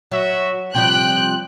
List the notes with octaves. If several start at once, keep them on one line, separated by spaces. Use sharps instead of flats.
F#3 F#4 E5
C3 F3 G3 G5 F#6